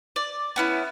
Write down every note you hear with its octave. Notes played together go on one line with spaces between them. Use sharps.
D5
B3 C#4 E4